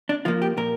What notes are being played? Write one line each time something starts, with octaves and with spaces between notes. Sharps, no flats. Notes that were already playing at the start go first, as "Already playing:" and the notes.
D4
F3 A#3 F4
G4
A#2 A#4